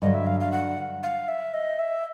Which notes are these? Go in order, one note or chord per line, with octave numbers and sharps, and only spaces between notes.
G2 D3 F#3 D#5
E5
F5
F5
F#5
F5
E5
D#5
E5